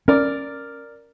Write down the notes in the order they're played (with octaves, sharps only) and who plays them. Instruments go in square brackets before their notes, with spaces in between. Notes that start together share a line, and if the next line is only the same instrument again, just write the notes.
[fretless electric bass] C#4 [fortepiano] A#4 D5